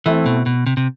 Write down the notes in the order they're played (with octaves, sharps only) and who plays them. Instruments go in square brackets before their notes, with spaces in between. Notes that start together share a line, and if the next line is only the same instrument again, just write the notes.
[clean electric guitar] E3 [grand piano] A3 C4 E4 A4
[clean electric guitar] B2
B2
C3
C3